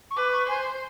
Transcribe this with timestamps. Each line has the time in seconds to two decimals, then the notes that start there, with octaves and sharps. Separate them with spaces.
0.11 C#6
0.16 B4 D6
0.32 C#6
0.48 C5 G#5